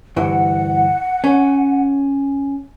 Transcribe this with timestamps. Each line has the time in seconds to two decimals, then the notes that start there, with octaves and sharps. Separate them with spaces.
0.16 D2 G2 E3 F#5
1.24 C#4